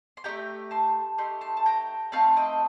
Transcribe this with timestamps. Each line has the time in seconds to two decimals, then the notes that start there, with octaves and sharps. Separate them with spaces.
0.17 C6
0.24 D#4 G4 G5 A#5
0.28 A3
0.71 A5 C6
1.18 A3 D#4 G4 C6
1.41 A5 C6
1.57 A5
1.66 G5 A#5
2.12 A3 C4 D#4 F5 A5
2.36 D#5 G5